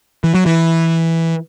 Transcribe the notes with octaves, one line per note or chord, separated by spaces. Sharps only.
E3
F#3
E3